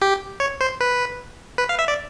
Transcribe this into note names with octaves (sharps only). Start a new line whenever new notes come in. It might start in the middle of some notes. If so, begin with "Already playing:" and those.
G4
C#5
C5
B4
B4
F5
E5
D5